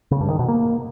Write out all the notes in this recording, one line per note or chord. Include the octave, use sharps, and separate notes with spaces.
C#3
G2
D#3
B2
A#3